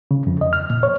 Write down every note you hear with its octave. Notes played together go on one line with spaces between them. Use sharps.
C#3
F2
D#5
F6
A#2
C#5